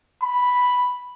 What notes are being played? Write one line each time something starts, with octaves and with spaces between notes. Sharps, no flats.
B5